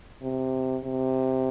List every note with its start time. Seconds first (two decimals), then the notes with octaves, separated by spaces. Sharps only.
0.22 C3
0.84 C3